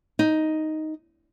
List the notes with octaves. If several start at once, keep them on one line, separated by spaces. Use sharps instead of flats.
D#4